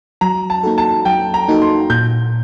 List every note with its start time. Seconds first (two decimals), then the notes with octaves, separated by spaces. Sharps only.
0.21 F#3 A#5
0.50 A5
0.63 A#3 D#4 F#4 A4
0.78 A5
1.05 F#3 G5
1.34 A#5
1.48 A#3 D#4 F#4 A4
1.62 C6
1.90 A#2 G6